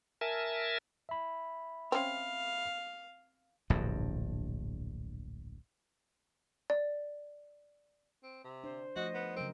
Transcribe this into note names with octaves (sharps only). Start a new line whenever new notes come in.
A#4 E5 G#5 A5
E5 B5
C4 C#4 F5
D1 A#1 G2
D5
C4
C3
D4 C5
F3 A3 F#4 D#5
B3
C#3 F#3 C4 A#4